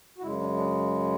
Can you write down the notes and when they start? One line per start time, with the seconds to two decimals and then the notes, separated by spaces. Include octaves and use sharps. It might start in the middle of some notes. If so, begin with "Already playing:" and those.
0.18 F#4
0.22 F#2 C#3 G#3 E4
0.40 D4
0.57 D4